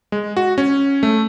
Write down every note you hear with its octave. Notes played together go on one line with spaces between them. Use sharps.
G#3
F#4
C#4
A3